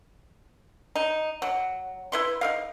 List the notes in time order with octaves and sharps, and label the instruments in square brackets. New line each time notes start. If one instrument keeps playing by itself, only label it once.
[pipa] D#4
F#3
E4 B4 C6
D#4 A#4 F5